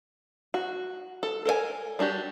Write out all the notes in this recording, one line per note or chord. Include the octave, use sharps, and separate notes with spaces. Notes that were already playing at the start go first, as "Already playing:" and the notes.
F#4
A4
A4 A#4 C5 G#5
G3 D4 F#4 G4